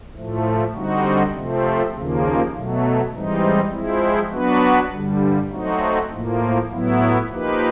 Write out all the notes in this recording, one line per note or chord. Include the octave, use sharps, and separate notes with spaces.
A2 F3 A3
D3 G3 C4 D#4 F#4
C3 F3 A3 C4
D#2 C#3 F3 A#3
B2 F#3 A3
G#2 E3 G3 C4 D#4
F3 G#3 C4 E4
F#3 B3 D4 F#4 B4
G2 D3 G3
F#3 A3 C4 D#4 F#4
A2 F3 A#3
A2 F#3 B3 E4
F3 A#3 D#4 G4 B4